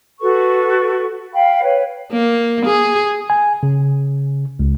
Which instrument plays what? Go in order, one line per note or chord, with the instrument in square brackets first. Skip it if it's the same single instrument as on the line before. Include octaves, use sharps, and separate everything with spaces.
[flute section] F#4 A4 B4 C#6
F5 G5 B5
B4 C#5
[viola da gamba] A#3
G#4
[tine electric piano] G#5
C#3
C#2